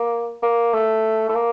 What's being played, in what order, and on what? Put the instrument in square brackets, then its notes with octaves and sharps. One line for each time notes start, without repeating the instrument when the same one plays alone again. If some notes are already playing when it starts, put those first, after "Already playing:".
Already playing: [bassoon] A#3
A#3
A3
A3
A#3